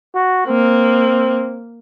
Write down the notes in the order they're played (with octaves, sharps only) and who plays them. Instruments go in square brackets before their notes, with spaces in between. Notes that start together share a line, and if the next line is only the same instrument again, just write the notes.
[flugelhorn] F#4
[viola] A#3 [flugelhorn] C4